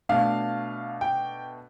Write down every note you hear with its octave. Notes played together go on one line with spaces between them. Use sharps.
B2 A3 D4 F5
G5